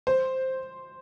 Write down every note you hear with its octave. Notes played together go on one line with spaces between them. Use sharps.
C5